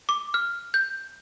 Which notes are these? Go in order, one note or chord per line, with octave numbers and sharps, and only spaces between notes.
D6
F6
G6